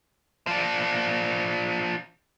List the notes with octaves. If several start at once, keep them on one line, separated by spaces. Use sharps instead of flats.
F3 D4